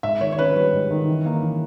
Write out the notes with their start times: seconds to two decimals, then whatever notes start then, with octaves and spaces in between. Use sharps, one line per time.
0.03 G#2 E5
0.21 D#3 C#5
0.32 C#5
0.38 C#4 B4
0.55 G3
0.73 G#2
0.90 D#3
1.08 E3
1.26 A#3
1.43 E3